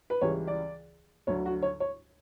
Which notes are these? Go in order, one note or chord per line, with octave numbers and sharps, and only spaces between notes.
B4
C#2 C#3 E3 G3 C#5
D5
D2 D3 F#3 C#5
F#4
C#5
C#5